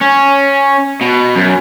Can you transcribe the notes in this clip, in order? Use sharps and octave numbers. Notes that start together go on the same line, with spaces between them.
C#4
B2
F#2